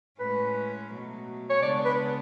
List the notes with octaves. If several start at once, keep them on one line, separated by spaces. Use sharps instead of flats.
A2 G#3 C#4 B4
B2 F#3 A3
C#5
C#3 G#3 B3 D4 D5
B4